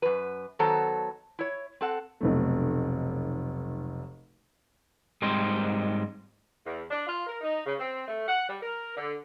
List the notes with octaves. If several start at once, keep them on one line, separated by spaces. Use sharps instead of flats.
F#2 B4
D#3 F#3 B3 A4 C5 A#5
E4 C#5
C4 A4 F#5
F1 B1 A3
G#2 G3 G#3 C4 C5
E2
D4
F4
A#4
D#4
C#3
C4
A3
F#5
G3
A#4
D3